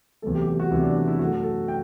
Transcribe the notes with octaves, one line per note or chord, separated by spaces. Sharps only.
E2 C3 F#3 A3 A4
G4
G4
F#4
E2 C3 F#3 A3 E4
D4
D4
E4
F#2 F#3 A3 F#4
A4
G5